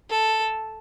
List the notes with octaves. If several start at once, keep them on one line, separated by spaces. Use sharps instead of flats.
A4